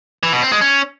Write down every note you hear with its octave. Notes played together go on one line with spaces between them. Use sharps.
E3
B2
C4
G#3
C#4